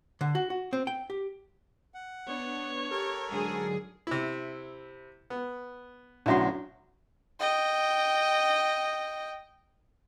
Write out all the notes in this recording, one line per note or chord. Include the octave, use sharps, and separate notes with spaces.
D3
F#4
F#4
C4
G5
G4
F#5
B3 D4 C#5
G4 A4 A#4 C#6 G#6
G#2 D3 F#3 G#4
C3 E4
B3
B1 A2 D3 F#3 C#4 E5 F#5 C6
D#5 G5